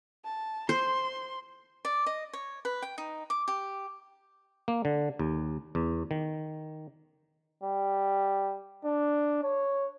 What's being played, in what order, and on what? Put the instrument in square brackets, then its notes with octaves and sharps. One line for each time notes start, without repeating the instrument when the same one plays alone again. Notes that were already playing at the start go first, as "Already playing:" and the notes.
[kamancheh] A5
[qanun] C5 [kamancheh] C6
[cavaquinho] D5
D#5
C#5
B4
G5
D#4
D6
G4
[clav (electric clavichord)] A#3
D3
D#2
E2
D#3
[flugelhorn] G3
D4
C#5